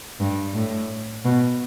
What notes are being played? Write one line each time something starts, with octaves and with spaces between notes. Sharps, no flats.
G2
A2
B2